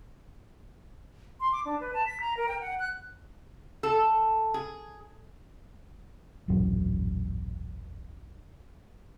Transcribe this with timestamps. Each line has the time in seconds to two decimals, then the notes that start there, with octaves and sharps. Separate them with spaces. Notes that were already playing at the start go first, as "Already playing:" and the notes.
1.40 C6
1.52 D6
1.65 D4
1.80 B4
1.94 A5
2.06 B6
2.21 A#5
2.37 A#4
2.49 G5
2.61 F#5
2.80 F#6
3.83 A4
4.54 G#4
6.48 D#1 A1 F#2 F#3